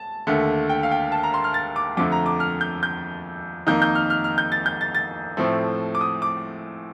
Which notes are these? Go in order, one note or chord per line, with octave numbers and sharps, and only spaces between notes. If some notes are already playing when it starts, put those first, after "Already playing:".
Already playing: A5
D#2 D3 A3
G5
F5
G5
A5
A#5
C6
F6
A6
D6
F2 D3 F3 A3 D6
A#5
D6
F6
G6
G6
F2 D#3 A#3 D#4 G6
G6
F6
F6
F6
G6
A6
G6
A6
A6
A2 F3 A3 C4
D6
D#6
D6